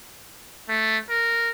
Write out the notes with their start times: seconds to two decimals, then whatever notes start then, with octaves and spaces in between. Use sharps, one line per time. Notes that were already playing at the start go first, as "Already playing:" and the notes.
0.69 A3
1.10 A#4